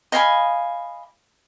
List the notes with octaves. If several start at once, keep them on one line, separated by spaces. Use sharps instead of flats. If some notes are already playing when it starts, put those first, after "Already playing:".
D#5 F5 G#5 B5